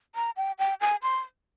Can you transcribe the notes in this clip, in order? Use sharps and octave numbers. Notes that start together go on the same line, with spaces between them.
A#5
G5
G5
G#5
C6